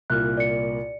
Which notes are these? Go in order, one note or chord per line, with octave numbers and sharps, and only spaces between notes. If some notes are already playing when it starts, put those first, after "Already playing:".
C2 A#2 F6 F#6
D5 C#7